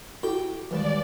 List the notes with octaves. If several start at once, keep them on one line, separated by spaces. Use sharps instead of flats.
E4 F#4 G4 A4 G5
D#2 E3 G3 G#3 B4 D5 E7